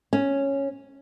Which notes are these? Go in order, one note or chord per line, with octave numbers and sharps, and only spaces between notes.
C#4